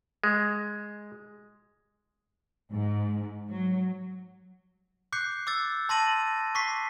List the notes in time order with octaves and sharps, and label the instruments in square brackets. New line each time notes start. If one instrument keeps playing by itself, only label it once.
[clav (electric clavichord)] G#3
[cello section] G#2
F#3
[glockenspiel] D6 F#6 G6 C7 C#7
D6 E6 A6
A5 C6 A6 A#6 D#7 F#7
C#6 D6 B6 C7